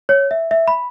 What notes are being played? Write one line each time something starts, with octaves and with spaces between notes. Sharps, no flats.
C#5
E5
E5
B5